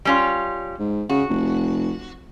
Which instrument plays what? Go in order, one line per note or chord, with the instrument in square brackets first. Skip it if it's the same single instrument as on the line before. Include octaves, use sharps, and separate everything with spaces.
[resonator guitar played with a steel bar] G3 C#4 F4
[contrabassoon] G#2
[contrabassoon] C#3 [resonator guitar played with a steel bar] F#4
[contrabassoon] F1